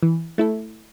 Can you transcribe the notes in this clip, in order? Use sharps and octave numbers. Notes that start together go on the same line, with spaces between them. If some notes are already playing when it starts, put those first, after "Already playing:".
E3
A3 E4 A4